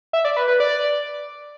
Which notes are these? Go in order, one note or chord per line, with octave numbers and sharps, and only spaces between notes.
E5
D5
B4
B4
D5